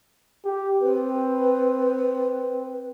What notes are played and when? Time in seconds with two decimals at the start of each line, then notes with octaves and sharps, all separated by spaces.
0.45 G4
0.81 C4 B4